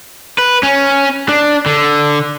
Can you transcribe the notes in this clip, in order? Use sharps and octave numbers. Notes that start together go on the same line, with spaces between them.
B4
C#4
D4
D3